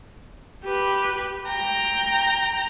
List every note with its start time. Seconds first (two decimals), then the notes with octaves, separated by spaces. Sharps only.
0.65 G4 B4
1.49 G5 A#5